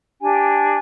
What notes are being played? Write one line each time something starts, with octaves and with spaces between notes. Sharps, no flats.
D4 G4 G#5